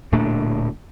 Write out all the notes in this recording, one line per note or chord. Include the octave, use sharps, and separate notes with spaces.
D1 A#2 A3 D4